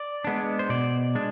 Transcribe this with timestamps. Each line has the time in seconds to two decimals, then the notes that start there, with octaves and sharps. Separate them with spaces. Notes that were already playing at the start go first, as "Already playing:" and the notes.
Already playing: D5
0.24 G#3 B3 D4
0.59 C5
0.69 B2 D5
1.15 G#3 D4